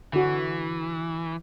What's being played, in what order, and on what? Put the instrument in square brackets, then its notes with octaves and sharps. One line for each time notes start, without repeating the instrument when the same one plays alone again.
[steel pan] D3 F#4 [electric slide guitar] E3